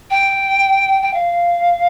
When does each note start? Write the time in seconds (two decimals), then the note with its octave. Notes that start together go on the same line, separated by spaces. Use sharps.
0.10 G5
1.02 G5
1.13 F5